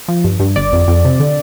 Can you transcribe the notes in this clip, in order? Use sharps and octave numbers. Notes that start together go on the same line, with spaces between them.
F3
G2
G2
G1 D5
F2
F2
C3
D3